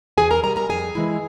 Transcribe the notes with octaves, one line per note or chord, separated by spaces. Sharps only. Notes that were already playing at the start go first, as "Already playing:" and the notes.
E2 G#4 G#5
A#4 A#5
C3 G3 A#4 A#5
A#4 A#5
F2 G#4 G#5
E3 G#3 E4